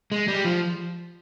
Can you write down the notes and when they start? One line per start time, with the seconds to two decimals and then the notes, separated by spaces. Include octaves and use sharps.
0.12 G#3
0.28 G3
0.45 F3